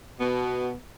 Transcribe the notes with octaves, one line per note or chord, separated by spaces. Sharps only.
B2 B3